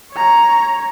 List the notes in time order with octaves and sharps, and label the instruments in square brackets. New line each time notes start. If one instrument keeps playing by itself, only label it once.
[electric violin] C#5 A#5